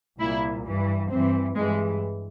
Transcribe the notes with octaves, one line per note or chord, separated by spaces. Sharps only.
C2 A#2 E4
G2 E3
G2 E3 C4
G2 E3 G#3